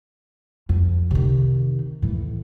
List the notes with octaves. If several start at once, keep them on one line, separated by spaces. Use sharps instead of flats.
F2
C3 D#3
A2 E3